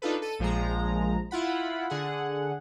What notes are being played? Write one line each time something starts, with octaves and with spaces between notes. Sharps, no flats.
D4 D#4 F4 A4 B4
A4 D#7
A#1 F3 G#3 A#5
E4 F4 F#5 B5
D3 G#4 F#5